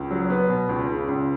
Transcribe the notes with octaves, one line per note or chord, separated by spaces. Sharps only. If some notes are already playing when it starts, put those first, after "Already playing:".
Already playing: C#2
F#3
B3
B2
C#2
C#3
C#2